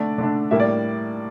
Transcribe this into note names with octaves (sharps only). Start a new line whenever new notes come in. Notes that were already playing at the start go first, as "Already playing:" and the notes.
Already playing: D3 A3 D4 D5
D3 A3 D4
A2 G3 A#3 E5
D5